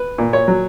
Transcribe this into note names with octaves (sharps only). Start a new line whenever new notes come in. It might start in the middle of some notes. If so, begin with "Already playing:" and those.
Already playing: B4
A#2
C#5
F#3